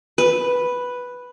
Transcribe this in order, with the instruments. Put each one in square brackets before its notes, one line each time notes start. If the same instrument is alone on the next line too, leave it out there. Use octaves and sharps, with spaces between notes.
[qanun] B4